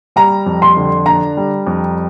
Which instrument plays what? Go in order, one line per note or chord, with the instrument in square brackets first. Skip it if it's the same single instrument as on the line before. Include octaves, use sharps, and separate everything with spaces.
[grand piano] G3 [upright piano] A#5
[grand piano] F2
[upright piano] C6
[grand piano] D3
[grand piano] D4 [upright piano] A#5
[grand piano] G3
F2